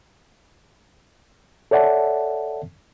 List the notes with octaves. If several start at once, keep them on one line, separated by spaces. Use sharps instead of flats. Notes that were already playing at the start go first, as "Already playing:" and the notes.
A4 C#5 D5 E5 F#5 A5